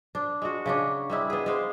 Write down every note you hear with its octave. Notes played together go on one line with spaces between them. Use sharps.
D4
G#3 F#4
C#3 C#4 D4
G3 G#3 E4
B3 G#4
G#3 G4 C5 F5